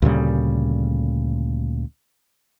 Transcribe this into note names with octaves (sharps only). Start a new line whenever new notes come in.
D2 A#2 C#3 G3